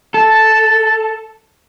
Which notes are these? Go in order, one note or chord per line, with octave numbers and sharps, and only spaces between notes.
A4 A5